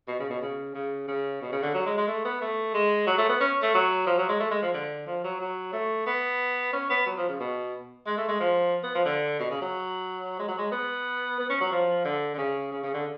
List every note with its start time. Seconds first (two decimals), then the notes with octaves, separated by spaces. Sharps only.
0.08 B2
0.20 C#3
0.30 B2
0.42 C#3
0.75 C#3
1.08 C#3
1.42 B2
1.52 C#3
1.63 D3
1.75 F#3
1.86 G#3
1.97 G#3
2.08 A3
2.25 B3
2.42 A3
2.74 G#3
3.07 F#3
3.18 A3
3.29 B3
3.41 C#4
3.63 A3
3.75 F#3
4.07 F3
4.18 F#3
4.29 G#3
4.40 A3
4.51 G#3
4.63 F3
4.74 D3
5.07 F3
5.24 F#3
5.41 F#3
5.73 A3
6.07 B3
6.73 C#4
6.90 B3
7.06 F#3
7.17 F3
7.29 C#3
7.40 B2
8.07 G#3
8.18 A3
8.29 G#3
8.40 F3
8.83 B3
8.95 F3
9.06 D3
9.40 B2
9.50 C#3
9.61 F#3
10.39 G#3
10.49 F#3
10.58 G#3
10.72 B3
11.40 B3
11.50 C#4
11.61 F#3
11.72 F3
12.05 D3
12.35 D3
12.38 C#3
12.72 C#3
12.84 C#3
12.94 D3